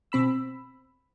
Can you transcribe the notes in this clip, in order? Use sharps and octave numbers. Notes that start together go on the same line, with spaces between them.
B2 C4 B5 E6